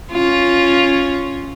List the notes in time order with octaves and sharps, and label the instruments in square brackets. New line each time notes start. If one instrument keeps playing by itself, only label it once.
[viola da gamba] C#4 F4